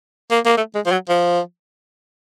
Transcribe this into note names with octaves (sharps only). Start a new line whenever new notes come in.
A#3
A#3
A3
G#3
F3
F#3
F3